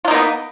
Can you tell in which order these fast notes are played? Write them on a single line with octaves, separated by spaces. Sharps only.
F4 D#4 A#3 B3